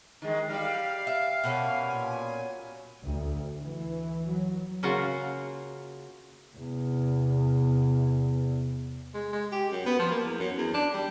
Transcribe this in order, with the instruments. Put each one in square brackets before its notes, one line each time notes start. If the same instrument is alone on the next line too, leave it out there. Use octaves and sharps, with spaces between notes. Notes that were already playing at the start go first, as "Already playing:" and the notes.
[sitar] D#3 G#3
[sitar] G3 G4 [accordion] F5
[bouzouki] E5
B2 A#3 C#4
[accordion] A#2 G#5
[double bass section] D2
E3
F#3
[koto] C#3 A#3 F4 F#4 F#5
[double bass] E2 C3
[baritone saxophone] G#3
G#3
G4
F#2
B3
F3
A#3
E2
F#2
E2
D4
G3